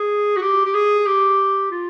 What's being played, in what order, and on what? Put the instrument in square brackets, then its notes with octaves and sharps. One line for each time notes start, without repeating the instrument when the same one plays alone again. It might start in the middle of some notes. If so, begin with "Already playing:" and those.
Already playing: [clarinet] G#4
F#4
G4
G4
G#4
G4
F4